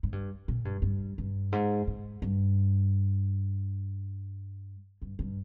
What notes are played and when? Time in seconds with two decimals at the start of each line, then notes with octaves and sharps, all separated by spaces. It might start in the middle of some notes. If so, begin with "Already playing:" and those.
0.03 G#2
0.12 G2
0.48 A#2
0.65 G2
0.82 G2
1.18 G2
1.52 G#2
1.87 G#2
2.22 G2
5.02 G2
5.19 G2